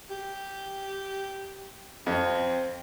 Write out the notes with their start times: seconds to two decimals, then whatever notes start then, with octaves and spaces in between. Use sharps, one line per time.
0.10 G4
2.07 F2 C4